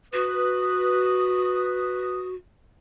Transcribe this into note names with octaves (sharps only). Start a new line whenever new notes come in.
F#4 B4 D#6